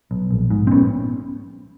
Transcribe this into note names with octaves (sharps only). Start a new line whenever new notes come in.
B1
A#1
G#2
C4
A#1 B3 C#4